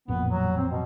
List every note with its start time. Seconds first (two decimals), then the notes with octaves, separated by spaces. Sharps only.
0.08 A1 F2 A#2 B3
0.29 F#3
0.57 C4
0.71 B2